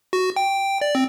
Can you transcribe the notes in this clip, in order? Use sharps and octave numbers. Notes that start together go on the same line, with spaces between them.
F#4
G5
D5
C4